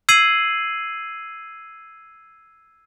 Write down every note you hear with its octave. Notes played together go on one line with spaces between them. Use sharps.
E6 G#6 C7 D#7 F#7